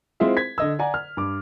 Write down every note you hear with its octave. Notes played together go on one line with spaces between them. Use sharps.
G#3 C4 E4 F4 G#4 E5
G#6 B6
D3 D#5 E6
D5 F#5 G#5 A#5
F6
G2 D6